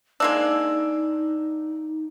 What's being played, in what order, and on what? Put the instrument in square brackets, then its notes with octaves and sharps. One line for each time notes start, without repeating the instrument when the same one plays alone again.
[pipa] G#3 A#3 D4 [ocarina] D#4 [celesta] E6